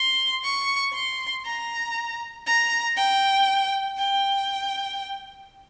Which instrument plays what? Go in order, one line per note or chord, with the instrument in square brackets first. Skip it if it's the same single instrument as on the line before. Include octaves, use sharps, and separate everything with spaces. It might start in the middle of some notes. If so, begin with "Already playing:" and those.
Already playing: [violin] C6
C#6
C6
A#5
A#5
G5
G5